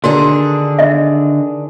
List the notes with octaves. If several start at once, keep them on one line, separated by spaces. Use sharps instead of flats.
D3 D#3 D4 F#4 G#4
D#5 E5